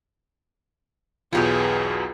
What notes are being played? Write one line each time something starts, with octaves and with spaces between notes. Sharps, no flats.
B1 E2 B2 F4 G4 G#4 B4 C#5